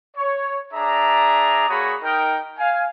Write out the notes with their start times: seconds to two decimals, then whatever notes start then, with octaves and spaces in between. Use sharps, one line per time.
0.16 C#5
0.73 D4 G#4 D5 E5 A#5
1.68 A#3 F#4 G#4 C#5 B5 D#6
2.02 D#4 A#4 G5
2.58 F5 G#5